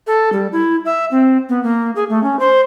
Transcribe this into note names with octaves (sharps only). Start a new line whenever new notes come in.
A4
G3
E4
E5
C4
B3
A#3
G#4
A3
C#4
C5